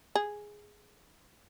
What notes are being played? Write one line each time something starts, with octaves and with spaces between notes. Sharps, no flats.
G#4